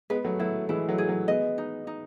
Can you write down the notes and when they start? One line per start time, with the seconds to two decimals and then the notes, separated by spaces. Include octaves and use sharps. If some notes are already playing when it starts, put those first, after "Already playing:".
0.10 G#3 B3 B4
0.25 F#3 A3
0.39 F#3 A3 E4
0.69 E3 G#3 E4
0.89 F#3 A3
0.98 G#4
1.08 F#3 A3
1.28 G#3 B3 D#5
1.58 D#4
1.87 D#4